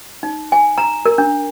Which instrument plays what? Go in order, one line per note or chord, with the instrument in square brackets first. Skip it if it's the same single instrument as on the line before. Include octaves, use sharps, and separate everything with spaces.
[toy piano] D#4
G#5
A#5
A#4
D4